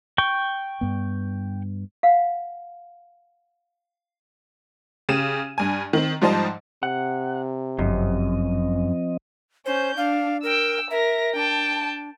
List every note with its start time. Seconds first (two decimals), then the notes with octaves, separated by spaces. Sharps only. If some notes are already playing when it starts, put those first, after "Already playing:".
0.18 G5 C#6
0.81 G2 B3
2.03 F5 F#5
5.09 C#3 G4 D#7 E7
5.58 G2 G#5
5.93 D#3 C4
6.21 G#2 F3 G3 D#4 C5 A5
6.83 C3 F#5
7.79 G1 F#2 F3 C4 D#5
9.66 C#4 C5 G6
9.97 D4 F5
10.43 A#4 G5 E6
10.91 A#4 E5 A#6
11.35 D4 G5 A5